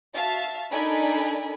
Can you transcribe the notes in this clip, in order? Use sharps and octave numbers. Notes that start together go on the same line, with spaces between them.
F#4 E5 F5 A5 A6 C7
D4 D#4 A4 A#4 G#5 B5